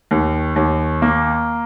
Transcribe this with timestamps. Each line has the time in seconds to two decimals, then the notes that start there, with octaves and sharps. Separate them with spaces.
0.11 D#2
0.56 D#2
1.02 A#3